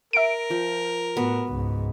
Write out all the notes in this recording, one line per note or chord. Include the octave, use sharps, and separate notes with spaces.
A#4 E5 D7
F3 G5
A2 B3 F#4
C#2 G#2